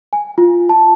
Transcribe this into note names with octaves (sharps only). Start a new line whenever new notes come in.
G#5
F4
A5